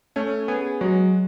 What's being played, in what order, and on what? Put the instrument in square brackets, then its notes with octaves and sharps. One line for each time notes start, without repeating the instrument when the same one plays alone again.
[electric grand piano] A3 [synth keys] C#4
[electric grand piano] B3 [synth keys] G#4
[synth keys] F#3 [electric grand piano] G#3